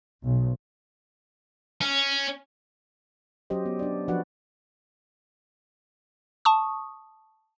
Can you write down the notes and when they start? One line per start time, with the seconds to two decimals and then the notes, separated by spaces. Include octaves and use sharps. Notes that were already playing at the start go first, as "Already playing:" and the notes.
0.24 B1
1.82 C#4
3.50 F#3 C#4 G4 C5 D#5
3.66 B3
3.79 D4 D5
4.08 F3 D4 F#4 B4 D5 F#5
6.45 A5 C#6 D#6